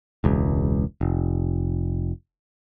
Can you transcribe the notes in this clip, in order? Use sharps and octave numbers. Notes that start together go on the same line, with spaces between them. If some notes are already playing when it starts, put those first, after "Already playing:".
E1 C#2
F1